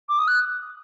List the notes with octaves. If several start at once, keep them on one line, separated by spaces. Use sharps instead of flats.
D6
D#6
F#6